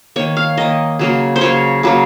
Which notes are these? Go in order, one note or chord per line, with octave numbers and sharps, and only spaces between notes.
D#3 A#3 C#5
F5
D#3 A#3 D#5
C#3 F#3 A#3
C5
C#3 F#3 A#3 C#5
C#3 F#3 A#3